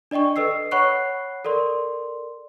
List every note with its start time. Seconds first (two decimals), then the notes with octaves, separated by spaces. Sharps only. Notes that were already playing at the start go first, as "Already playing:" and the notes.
0.11 D4 D5 D#5 G5 C#6
0.36 A4 B4 D#5 E6 C7
0.71 C#5 F#5 B5 C#6 F#6 C7
1.45 A4 A#4 D5 C6